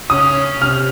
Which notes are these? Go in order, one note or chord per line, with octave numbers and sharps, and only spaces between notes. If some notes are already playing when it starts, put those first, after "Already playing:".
C#3 C#4 D#6
C3 F6